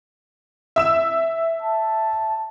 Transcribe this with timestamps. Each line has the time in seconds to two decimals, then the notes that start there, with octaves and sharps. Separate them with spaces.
0.76 E5 E6 E7
1.62 A5